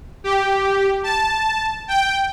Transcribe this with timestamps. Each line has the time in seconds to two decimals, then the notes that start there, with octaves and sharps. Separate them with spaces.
0.24 G4
1.03 A5
1.88 G5